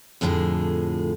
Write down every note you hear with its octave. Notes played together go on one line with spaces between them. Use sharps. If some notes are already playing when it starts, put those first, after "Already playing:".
F2 A2 D3 F3 G#4